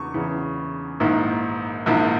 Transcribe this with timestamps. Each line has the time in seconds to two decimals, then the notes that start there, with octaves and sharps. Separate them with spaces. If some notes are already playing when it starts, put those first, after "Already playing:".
Already playing: E2 C#3 C#6
0.14 E2 C#3 E3
1.00 A#1 G#2 D#3 A#3 E4
1.86 A#1 G#2 D#3 A#3 E4